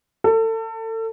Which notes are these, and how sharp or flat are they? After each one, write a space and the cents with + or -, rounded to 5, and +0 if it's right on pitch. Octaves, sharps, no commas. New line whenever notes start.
A4 +30